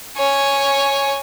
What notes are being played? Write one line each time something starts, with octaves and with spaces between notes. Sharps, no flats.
C#5 G#5